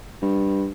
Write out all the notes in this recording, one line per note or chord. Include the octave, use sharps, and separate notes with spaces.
G2